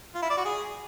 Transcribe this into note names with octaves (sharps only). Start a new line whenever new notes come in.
F4
E4
D5
F#4
G#4